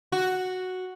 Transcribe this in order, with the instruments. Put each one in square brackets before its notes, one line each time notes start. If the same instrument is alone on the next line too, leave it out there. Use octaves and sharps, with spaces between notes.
[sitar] F#4